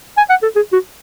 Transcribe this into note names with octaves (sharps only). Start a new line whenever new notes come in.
G#5
F#5
A4
G#4
F#4